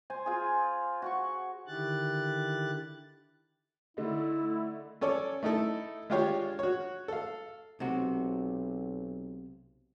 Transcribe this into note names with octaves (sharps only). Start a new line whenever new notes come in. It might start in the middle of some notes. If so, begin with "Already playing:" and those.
C5 G#5
F4 G#4
F#4 F#5 C#6
D3 D#3 E4 G4 F#6 A6
D3 A3 D#4 E4
C#4 A4 C#5 D5
A3 D#4 E4 A4
G#3 D4 F4 G4 C#5 F5
F#4 C#5
A4 F5
B1 C3 G#3 F#4